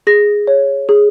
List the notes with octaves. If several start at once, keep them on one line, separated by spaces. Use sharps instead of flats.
G#4 A#6
C#5
G#4